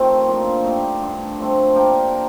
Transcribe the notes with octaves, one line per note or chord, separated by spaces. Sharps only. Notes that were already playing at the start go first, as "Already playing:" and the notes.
Already playing: C3 D#3 A3 C4 D#4 F4
A#2 F3 A#3 D4
A3 D#4 G4 D5
G2 D3 A3
D3 F3 A3 C4
A#3 D4 G4 A#4
A#4